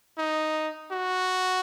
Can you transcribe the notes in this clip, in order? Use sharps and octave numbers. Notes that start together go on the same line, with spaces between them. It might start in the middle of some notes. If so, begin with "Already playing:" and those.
D#4
F#4